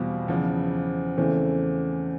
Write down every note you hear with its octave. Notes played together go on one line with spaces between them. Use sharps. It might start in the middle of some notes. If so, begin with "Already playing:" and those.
Already playing: E2 B2 G3 C4 F4
E2 C#3 F3
E2 C#3 E3 A3 C4